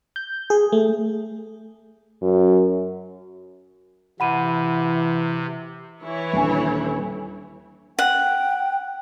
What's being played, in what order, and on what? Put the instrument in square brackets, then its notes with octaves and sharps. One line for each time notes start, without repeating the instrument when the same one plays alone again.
[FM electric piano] G6
G#4
A3
[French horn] F#2
[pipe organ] C3 [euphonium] E3 [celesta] F#5 B5 D#7
[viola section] E3 E4 C#5
[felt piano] D#1 D3 G#5
[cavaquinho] F#5 [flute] G5